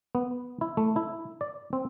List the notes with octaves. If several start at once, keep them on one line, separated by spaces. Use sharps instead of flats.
B3
E4
A3
E4
D5
C4